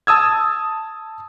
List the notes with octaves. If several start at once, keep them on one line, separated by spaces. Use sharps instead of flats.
A5 D#6 E6 G#6